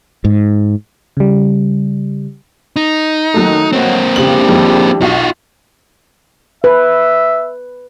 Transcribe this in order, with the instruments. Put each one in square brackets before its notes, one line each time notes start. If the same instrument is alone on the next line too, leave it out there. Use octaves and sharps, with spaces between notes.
[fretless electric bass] G#2
[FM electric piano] C#3 G3
[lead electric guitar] D#4
[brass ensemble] F#2 D#3 [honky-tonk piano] F#3 A3
[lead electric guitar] A#3 C4 [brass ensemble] C#5 D#5 F#5
[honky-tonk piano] C#3 F#7 [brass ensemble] D4 E4 G4
[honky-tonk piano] F2 D#3 G#3
[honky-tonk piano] B1 [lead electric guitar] F4 F#4
[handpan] B4 [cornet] E5